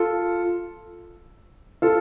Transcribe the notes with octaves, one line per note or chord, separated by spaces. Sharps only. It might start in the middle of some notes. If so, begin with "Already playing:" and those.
Already playing: F4 A4
F4 A4